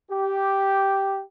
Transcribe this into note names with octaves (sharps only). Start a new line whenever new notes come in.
G4